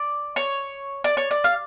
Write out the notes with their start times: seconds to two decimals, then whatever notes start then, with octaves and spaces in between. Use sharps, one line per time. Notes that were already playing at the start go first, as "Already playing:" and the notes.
Already playing: D5
0.36 C#5
1.04 D5
1.17 C#5
1.31 D5
1.44 F5